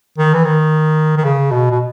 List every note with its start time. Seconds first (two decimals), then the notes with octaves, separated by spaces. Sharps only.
0.18 D#3
0.34 E3
0.45 D#3
1.17 D#3
1.25 C#3
1.51 B2
1.71 B2